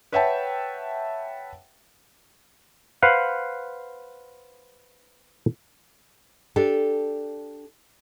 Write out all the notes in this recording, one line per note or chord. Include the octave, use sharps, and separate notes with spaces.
B4 C#5 E5 F#5 G5 A5
B4 C5 F5 F#5
D4 G4 A4